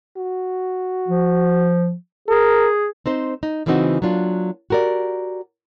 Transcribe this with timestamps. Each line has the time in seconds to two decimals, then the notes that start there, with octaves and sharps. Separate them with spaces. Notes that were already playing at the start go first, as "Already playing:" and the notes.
0.17 F#4
1.08 F3
2.28 G#4 A#4
3.06 C4 D#4 C5
3.43 D#4
3.66 C#3 E3 A#3 C4 D#4 F#4
4.02 F#3 A#3 D4 F4
4.70 F#4 G4 A#4 B4 D5